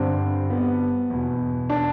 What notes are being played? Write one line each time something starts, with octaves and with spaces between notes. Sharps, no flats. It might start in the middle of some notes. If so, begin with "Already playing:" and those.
Already playing: G2 D3 C4
B3
E2 B2
D4